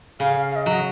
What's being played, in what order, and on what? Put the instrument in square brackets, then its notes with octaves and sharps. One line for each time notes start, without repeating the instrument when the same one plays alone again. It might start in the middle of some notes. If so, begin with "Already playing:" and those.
[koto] C#3 [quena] F5
[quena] F5
D#5
[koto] F#3